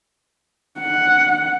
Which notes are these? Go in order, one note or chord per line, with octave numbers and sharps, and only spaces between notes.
F#5